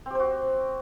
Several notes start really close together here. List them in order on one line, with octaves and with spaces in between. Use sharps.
C4 G4 C5 F#4